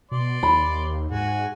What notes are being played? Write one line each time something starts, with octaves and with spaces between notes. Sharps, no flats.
B2 D5 C6
D#2 B5
G#2 F#4 G#5